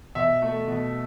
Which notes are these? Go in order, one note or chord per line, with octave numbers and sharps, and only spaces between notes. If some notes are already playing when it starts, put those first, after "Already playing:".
B2 E5
A3
B2